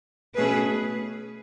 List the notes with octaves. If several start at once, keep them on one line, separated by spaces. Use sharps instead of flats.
B2 A3 C#4 G#4 B4